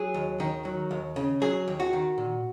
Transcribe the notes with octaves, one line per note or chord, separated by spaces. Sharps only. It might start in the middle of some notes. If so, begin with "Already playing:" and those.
Already playing: F#3 G#4
D#2
D#3
F#3
D#2
C#3
F#3 G#4
D#2
F#4
D#3
A#2